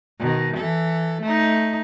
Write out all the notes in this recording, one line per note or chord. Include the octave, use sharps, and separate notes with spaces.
B2 D#3
E3 A4
A3 D#4